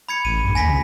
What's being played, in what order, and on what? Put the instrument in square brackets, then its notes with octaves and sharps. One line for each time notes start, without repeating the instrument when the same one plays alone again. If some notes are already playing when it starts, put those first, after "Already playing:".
[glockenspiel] B5 G#6 C#7
[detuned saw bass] A1 [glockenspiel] D#7
[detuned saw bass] G2
[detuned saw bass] D#2 [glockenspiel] G#5 A#6 B6
[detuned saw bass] C#2